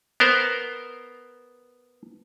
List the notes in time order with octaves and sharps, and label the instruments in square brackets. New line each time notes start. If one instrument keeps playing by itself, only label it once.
[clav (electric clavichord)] B3 A#4 C5